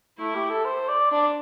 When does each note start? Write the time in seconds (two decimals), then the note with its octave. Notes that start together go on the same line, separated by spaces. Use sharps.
0.19 A3 E4
0.35 G4
0.50 A4
0.65 C5
0.89 D5
1.11 D4 D5